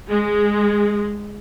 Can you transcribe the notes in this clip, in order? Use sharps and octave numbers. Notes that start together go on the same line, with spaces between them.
G#3